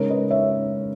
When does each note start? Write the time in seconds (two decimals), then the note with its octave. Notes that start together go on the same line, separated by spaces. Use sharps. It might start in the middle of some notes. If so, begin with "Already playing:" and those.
Already playing: C#3 G#3 D#4 A#4 C#5
0.10 B4 D#5
0.31 C#5 E5